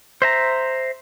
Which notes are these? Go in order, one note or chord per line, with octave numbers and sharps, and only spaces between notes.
C5 E5 A#5